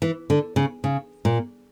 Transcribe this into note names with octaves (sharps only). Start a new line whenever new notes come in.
E3
D3
C#3
C#3
A#2